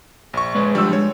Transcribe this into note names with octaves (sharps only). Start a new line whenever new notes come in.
A#1 C#6
G#3 B4 C#5
D3 F3 G3 G#3 E6
G#3 C#5